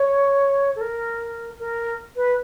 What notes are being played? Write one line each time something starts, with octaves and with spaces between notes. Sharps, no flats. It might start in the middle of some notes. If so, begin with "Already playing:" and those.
Already playing: C#5
A4
A#4
A#4
B4